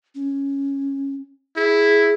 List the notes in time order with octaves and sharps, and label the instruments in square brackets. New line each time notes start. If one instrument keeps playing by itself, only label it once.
[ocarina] C#4
[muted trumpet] E4 [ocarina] G#4